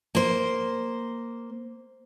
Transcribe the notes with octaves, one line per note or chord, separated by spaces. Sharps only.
A#3 C5